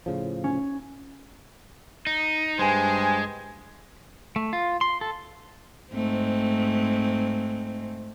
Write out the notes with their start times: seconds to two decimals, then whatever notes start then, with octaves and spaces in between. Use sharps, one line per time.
0.06 A2 C#3 F3
0.44 C#4
2.07 D#4
2.59 G2 G#3 C5 G#5
4.36 A3
4.53 F4
4.81 C6
5.01 A4
5.92 G#2 A3 C4